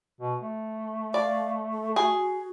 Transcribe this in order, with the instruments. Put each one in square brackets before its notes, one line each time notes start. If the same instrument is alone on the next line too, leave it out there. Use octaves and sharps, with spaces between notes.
[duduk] B2
A3
[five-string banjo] D5 [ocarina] F5
[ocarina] A4
[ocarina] F#4 [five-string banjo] G#4